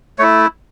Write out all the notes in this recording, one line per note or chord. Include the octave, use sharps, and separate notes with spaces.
A3 E4 C#5